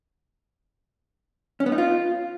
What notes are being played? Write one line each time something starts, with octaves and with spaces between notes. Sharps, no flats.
C#4
B3
D#4
F4